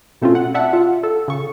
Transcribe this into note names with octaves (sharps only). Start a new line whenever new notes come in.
B2 A3 C4 C#4 F4
F#5
D5 E5 F#5 A5
F4
A4
C#3 C#6